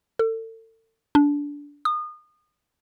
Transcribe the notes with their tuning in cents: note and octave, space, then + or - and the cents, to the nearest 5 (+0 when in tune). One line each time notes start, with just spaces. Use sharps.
A4 +35
D4 -20
D#6 -30